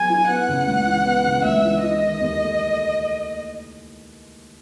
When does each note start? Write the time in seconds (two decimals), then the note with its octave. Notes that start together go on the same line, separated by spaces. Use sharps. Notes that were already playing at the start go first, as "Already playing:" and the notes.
Already playing: F#3 B3 G#4 G#5
0.10 E4
0.29 B3 F#5
0.48 C#3
0.67 C#2
0.86 E3
1.06 B3
1.26 C#3
1.44 C#2 E5
1.64 E3
1.82 E4 D#5
2.02 D#3
2.21 D#2
2.41 A3